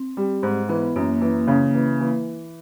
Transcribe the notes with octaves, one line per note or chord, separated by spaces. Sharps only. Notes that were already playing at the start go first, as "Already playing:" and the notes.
Already playing: C4
G3
G#2
E3 B3
F#2 A#3
E3 A#3
C#3
E3
E3